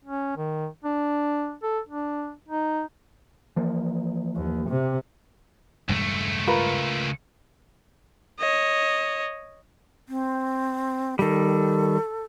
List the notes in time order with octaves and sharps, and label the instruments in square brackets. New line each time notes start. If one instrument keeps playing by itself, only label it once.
[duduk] C#4
D#3
D4
A4
D4
D#4
[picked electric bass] E3 F3 A#3
[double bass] D#2
C3
[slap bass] E1 G2 G#3 [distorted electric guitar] C#2 A3
[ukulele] F4 A#4 B4
[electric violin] C#5 D#5
[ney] C4
[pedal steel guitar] D#3 G3 [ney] A4